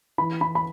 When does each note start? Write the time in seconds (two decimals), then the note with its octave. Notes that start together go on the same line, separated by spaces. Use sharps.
0.18 E3 B5
0.41 E3 B5
0.55 B5